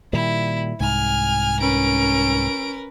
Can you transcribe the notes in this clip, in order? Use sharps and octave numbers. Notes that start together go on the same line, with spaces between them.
A#2 D#3 G3 E4
C2 G#2 G#5 F6
C#4 A#4 B4 D7